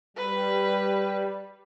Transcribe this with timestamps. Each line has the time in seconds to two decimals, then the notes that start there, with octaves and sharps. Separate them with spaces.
0.17 G3 B4